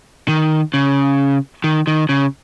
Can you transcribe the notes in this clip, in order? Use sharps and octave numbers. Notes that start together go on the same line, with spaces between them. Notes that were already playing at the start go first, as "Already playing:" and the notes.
D#3
C#3
D#3
D#3
C#3